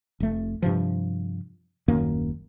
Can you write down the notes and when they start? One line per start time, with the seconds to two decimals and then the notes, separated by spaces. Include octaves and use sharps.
0.20 F1 A3
0.62 G2 C3 F3
1.88 D#1 F#2 D#3 A#3